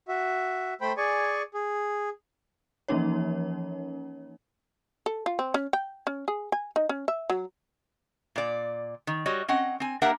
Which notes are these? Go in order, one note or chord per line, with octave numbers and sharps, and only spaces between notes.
F#4 E5
A3 C5 G5 B5
G#4 D5 G#5 C#6
G#4
E3 F3 A#3 C#4 D#4 C#5
A4
F4
C4
C#4
G5
C#4
G#4
G#5
D#4
C#4
E5
F#3
A#2 D5
D#3
G3 F#4 C#5 D#5
C4 C#4 D#5 F#5
C4 G#5
A#3 D4 G4 A#4 E5 F#5